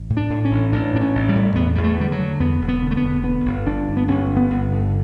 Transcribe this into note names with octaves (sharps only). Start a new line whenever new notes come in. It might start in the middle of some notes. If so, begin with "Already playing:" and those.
Already playing: A1
A2
D4
A2
C#4
A1
A1 D4
A2 D4
C#4
A1
G3
A2
E2 B3
E2 G3
A3
D3 G3
F#3
D3
E2 B3
E1
B3
D3
A3
B3
E1
D3 B3
G1
G1 D4
G1
B3
G1 C#4
G2
B3
G1
D3